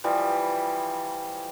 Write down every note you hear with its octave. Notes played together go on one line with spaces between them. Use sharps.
E3 F3 G3